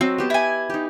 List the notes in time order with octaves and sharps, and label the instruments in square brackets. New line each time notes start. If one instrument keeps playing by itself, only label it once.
[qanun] F#3 F#4 D#5 [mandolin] C4
[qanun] B3 G4 A5
[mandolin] E4 G#5
[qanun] D#4 G4